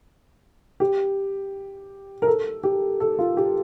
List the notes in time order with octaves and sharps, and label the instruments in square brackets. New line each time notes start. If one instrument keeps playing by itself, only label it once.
[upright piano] G4
A#4
A4
G4
A4
F4
G4